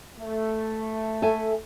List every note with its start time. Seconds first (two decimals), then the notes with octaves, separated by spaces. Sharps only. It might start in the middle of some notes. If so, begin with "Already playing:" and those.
0.19 A3
1.22 A4 E5 G#5